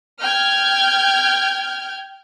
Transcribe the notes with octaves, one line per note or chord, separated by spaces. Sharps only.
G5 F6 G6 G#6